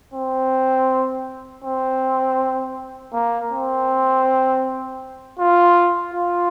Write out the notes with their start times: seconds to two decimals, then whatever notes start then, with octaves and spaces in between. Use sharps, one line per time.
0.14 C4
1.64 C4
3.13 A#3
3.52 C4
5.39 F4
6.14 F4